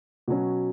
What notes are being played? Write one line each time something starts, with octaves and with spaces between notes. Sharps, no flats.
B2 F#3 C#4